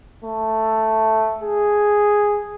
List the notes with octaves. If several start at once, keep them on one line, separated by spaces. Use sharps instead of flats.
A3
G#4